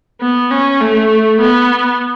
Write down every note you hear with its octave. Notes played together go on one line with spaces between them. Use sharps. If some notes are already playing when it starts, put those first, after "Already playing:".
B3
C#4
A3
B3